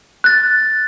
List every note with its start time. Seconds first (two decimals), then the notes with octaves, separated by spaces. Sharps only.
0.24 F#6 A6